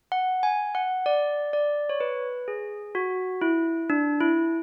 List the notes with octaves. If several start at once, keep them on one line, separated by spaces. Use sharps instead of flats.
F#5
G#5
F#5
D5
D5
C#5
B4
G#4
F#4
E4
D4
E4